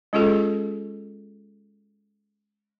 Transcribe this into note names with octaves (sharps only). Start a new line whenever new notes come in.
G#3 C#4 F4 G#4 A4